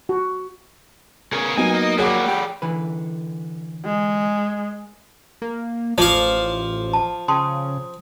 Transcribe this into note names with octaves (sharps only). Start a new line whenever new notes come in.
F#4
B3 G#4 A#4 C#5
F#3 A#3 B3 D#4 G#5
D#5
F#3 G3 F#4 G#4 D6
G4
D3 E3 B4
G#3
A#3
A1 F3 F4 C5 D5 F5 D6
A5
C#3 G5 A5 C6 D#6